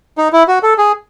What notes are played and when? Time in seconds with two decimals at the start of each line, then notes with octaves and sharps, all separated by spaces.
0.18 D#4
0.33 E4
0.48 F#4
0.63 A4
0.78 G#4